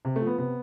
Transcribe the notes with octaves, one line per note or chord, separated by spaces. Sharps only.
C3
A3
F3
B3
C3 B3